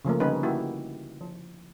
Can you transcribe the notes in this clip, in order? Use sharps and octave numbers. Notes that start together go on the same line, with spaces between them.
C#3 F3 A3 A#3
D3 G3 C#4 D#4 B4 C#5
A#3 E4 F#4 G4
F3